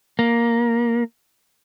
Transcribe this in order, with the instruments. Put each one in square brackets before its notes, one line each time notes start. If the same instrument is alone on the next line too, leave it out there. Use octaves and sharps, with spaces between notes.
[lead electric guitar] A#3